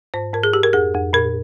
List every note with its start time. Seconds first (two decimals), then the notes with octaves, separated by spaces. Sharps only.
0.14 G#2 C5
0.33 G#2 A#4
0.44 G#4
0.53 G#2 G4
0.63 A#4
0.73 F2 G#4
0.94 F2
1.13 A#2 A#4